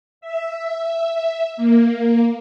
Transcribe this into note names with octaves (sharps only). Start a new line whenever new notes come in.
E5
A#3